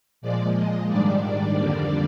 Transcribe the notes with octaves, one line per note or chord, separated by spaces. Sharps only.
A#2 F3 G#3 D5
D#5
G#2 D#3 G3 D4 D5
D5
F2 D3 G3 A#3